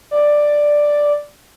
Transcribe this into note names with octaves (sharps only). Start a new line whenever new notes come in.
D5